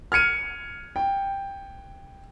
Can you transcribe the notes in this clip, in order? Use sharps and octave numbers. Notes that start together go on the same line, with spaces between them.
F6 G#6 C#7 D#7
G5